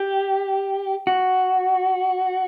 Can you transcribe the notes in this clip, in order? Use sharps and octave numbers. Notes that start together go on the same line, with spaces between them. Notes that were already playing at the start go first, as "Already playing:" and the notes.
Already playing: G4
F#4